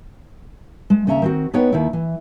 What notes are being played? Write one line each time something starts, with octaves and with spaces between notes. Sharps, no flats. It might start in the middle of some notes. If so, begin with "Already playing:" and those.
G#3
D#2 C#3 C#4 E5 G#5 A#5
D#3 C4 F#4
B3 D#4 B4 C#5 G5
D#2 D#3 A#3 E4
E3